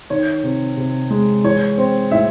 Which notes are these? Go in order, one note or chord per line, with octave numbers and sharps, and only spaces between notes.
D#3 C#5
C3
C3
G#3
E3 C#5
C4
A2 E5